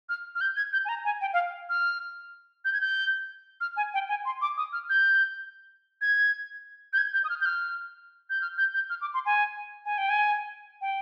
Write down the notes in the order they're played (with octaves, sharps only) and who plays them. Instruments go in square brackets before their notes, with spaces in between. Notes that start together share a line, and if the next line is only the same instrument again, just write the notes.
[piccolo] F6
F6
G6
G#6
G6
G#5
A#5
G#5
G5
F5
F6
G6
G#6
G6
F6
G#5
G5
G#5
C6
D6
D#6
F6
G6
G#6
G6
G#6
G6
D#6
F6
G6
F6
G6
F6
G6
G6
F6
D6
C6
G#5
G#5
G5
G#5
G5